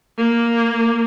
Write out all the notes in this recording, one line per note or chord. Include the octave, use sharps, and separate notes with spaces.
A#3